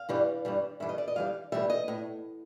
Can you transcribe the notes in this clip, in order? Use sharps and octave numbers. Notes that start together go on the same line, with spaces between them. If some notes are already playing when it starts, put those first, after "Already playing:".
Already playing: F5
G2 E3 G3
G2 E3 G3
G2 E3 G3 E5
D#5
D5
D#5
G2 E3 G3 F5
A2 E3 G3 E5
D#5
A2